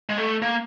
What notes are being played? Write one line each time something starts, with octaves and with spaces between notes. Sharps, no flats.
G#3
A3
A#3